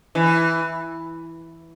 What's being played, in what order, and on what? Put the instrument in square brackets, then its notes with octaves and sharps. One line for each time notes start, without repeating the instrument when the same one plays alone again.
[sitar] E3